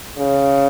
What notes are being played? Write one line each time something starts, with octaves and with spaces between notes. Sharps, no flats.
C#3